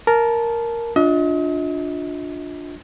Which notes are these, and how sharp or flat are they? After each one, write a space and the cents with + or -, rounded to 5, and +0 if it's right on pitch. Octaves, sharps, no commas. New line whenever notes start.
A#4 +0 A5 -20
D4 +0 F4 +20 D#5 +40